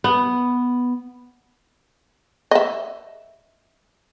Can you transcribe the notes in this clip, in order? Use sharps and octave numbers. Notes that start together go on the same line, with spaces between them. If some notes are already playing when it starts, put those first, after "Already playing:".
B3
D#5 E5